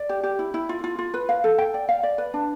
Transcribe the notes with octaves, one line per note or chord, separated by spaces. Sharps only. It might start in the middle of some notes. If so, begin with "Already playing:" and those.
Already playing: D5
G4
G4
E4
E4
F4
F4
F4
B4
F5
A4
G5
D5
F5
D5
B4
D4